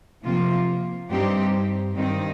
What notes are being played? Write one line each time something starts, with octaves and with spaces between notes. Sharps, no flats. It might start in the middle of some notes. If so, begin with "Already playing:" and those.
C3 F3 A#3 F4
G2 G3 C4 D#4 G4
G2 D#3 C4 D#4